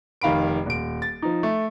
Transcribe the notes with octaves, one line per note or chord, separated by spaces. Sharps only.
F1 D#3 F5 B5 D7
D#1 D7
A6
F3 D#4
A3